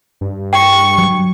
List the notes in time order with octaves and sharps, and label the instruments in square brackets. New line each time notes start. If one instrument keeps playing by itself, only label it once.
[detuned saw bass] G2
[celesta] G5 [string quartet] C#6
[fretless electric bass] F#3